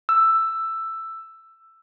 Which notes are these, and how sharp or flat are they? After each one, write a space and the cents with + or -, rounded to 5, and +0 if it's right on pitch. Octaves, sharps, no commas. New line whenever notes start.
E6 +10